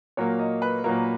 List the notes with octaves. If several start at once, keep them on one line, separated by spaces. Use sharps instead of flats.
A#2 F#3 A#3 C#5
D#5
B4
A#2 F#3 A#3 A#4